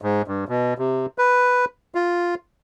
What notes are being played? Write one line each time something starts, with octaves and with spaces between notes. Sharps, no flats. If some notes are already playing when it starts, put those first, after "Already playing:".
G#2
G2
B2
C3
B4
F4